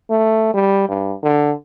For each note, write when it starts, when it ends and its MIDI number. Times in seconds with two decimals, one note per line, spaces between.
0.10 0.49 57
0.54 0.86 55
0.89 1.14 43
1.22 1.53 50